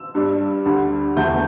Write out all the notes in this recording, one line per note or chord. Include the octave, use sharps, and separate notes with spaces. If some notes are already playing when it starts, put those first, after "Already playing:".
Already playing: E6
G2 G3 D4
D2 D3 G3
E2 D3 A3 G6